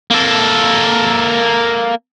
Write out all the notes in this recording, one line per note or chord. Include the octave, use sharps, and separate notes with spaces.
A#3 A4